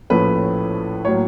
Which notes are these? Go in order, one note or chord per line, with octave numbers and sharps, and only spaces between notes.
A#1 A2 F3 A3 C#4 B4
A2 F#3 A#3 C#5